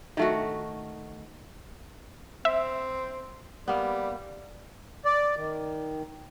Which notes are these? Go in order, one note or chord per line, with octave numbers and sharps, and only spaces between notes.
D#3 A3 F#4
C4 E5
G3 A#3 B3
D5
D#3